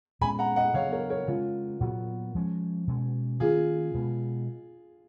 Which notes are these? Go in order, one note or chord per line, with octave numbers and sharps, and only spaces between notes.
A#2 G#3 C#4 G#5 B5
F#5 A#5
D#5 F#5
C#3 F#3 B3 C#5 F5
A#4 C#5
A#4 C#5
C#3 G#3 C#4 F4
A#2 F#3 B3 F#4
F3 G#3 C#4
B2 G#3 C#4
D#3 A#3 C#4 F4 G#4
B2 G#3 B3